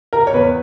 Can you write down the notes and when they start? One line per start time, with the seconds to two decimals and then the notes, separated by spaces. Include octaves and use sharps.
0.13 A#4
0.27 C#5
0.33 E2 B4